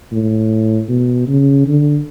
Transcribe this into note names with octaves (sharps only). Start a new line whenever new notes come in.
A2
B2
C#3
D3